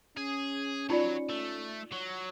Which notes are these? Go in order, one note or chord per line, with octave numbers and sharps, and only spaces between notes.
C#4 G#4
F#3 D#4 F4 C#5 D5
A3
F#3